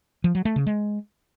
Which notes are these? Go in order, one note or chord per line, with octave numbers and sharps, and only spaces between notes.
F3
F#3
A3
C#3
G#3